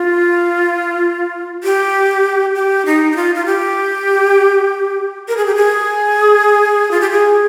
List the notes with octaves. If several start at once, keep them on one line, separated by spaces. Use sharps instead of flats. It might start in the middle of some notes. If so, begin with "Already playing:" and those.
Already playing: F4
G4
G4
D#4
D#4
F4
F4
G4
A#4
G#4
G4
G#4
F4
G4
G#4